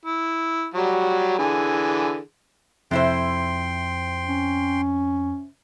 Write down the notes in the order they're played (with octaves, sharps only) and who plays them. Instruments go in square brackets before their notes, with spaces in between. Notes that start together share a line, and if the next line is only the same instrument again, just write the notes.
[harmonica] E4
F#3 G3 F#4
D3 E3 G#4
[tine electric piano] F2 [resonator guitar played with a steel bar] C3 E4 C5 [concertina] G5 C6
[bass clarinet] C#4